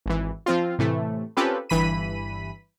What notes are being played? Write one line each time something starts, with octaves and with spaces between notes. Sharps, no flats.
G#1 E3
F3 C4 F4
A2 C3 E3 A3
C4 C#4 F4 G4 A4 B4
G1 G2 E3 B5 B6 D#7